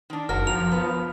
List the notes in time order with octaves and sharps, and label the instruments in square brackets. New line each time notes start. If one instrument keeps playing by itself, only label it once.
[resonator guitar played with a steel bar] D#3 D4
[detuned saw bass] F#1 [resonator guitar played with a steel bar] F#4 A#4 [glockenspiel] F6
[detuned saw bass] F3 [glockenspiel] F7
[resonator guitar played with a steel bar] B3